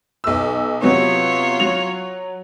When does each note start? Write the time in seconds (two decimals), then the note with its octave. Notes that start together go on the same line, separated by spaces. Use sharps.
0.24 B1 E6
0.82 C3 F#3 B3 F4 C#5
1.60 F#3 F7